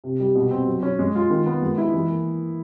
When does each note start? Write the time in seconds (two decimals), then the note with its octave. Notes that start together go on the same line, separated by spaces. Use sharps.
0.04 C3
0.20 G3
0.35 B2
0.51 C4
0.67 F#3
0.83 C#4
0.99 G#3
1.15 F4
1.30 D#3
1.46 B3
1.62 G#3
1.78 E4
1.94 E3
2.10 A#3